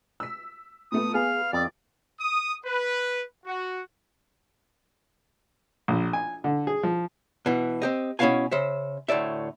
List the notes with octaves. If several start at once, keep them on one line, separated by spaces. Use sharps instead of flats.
E6 B6
A#2 A3 B3 D#6
B3 G#4 F5
F2 D5
D#6
B4
F#4
A#1
G#5
D3
G#4
F3
B2 E3
C4 G4 D#5
B2 C#4 E4 F#4 F5 G#5
C#3 C5 E5
D2 A2 D5 E5